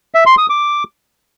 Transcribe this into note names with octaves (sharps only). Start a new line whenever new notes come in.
E5
C6
D#6
D6